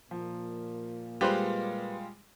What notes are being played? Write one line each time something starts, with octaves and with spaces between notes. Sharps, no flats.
A#2 F3 A#3
G3 G#3 F4 G4 B4 C5 C6